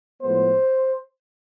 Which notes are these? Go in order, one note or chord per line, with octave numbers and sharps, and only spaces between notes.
A2 F3 G#3 B3 C5